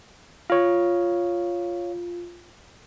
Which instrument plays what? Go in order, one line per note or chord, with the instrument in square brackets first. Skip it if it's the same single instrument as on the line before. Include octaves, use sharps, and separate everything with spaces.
[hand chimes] F4 [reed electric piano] C#5 F5